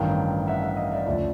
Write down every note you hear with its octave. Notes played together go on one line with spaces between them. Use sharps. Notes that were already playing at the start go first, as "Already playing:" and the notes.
Already playing: A1 G2 D#3 F5 G5
E5 F#5
E5 F#5
D#5 F5
D5 E5
D2 C#3 F3 D5 E5